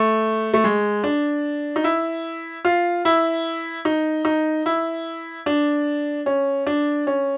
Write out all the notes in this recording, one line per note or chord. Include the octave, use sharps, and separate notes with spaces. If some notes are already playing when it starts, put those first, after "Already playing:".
Already playing: A3
A3
G#3
D4
D#4
E4
F4
E4
D#4
D#4
E4
D4
C#4
D4
C#4